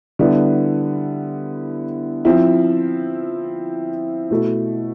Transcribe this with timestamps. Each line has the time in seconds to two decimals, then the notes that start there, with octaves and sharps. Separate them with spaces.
0.19 D3 G3 B3 E4
2.25 F3 C4 E4
4.31 B2 A3 E4